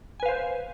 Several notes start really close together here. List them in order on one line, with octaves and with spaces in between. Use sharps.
G#5 B4 F5 C5